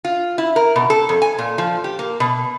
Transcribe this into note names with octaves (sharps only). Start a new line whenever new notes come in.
F4
E4
A#4
B2
A4
F2
G#5
A#2
F3
G4
A#3
B2